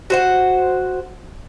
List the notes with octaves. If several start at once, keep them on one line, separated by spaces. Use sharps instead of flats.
F#4 C5 F#5